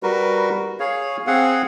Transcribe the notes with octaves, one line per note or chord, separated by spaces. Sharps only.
G3 F#4 A#4 B4
G#4 C#5 F5
C4 G#4 F5 F#5